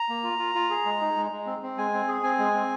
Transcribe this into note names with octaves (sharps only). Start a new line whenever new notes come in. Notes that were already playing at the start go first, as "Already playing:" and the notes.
Already playing: A#5
A#3
F4
F4
F4
G#4
G#3
D#4
G#3
G#3
C4
C4
G#3 G#5
C4
G#4
C4 G#5
G#3
C4